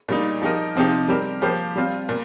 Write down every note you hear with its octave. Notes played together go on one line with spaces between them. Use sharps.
A#2 G3 D#4
F3 D#4 G4 A#4 D#5
C3 F3 C4 D#4 G4
G3 C4 G4 A#4
F3 A#3 G4 C5
G3 C4 F4
A#2